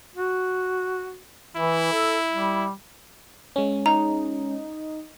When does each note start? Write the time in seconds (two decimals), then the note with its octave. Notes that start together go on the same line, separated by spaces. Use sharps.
0.15 F#4
1.56 E3 E4
1.92 A4
2.32 G3
3.56 G#3 C#4
3.86 D#4 A#5